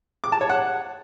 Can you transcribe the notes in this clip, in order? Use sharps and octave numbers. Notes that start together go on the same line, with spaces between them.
D6
A5
C#5
F#5